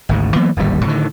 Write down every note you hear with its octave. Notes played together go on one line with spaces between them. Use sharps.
G#1 D2 G#2
E3 F#3 A#3 B3
D1 G#1 D#2 G3
A2 D3 D#3